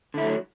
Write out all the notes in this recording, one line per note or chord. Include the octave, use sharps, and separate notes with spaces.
D3 F#3 A3 E4